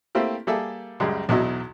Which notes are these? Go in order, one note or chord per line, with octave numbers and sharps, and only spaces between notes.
A3 A#3 C4 E4 G4
G3 A#3 G#4 A4 D5 E5
C#2 F#2 C#3 G3 G#3
B1 E2 F#3 E4 D#5